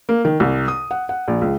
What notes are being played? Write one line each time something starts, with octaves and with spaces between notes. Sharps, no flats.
A#3
D#3
C2
D#6
F#5
F#5
A#1
C#2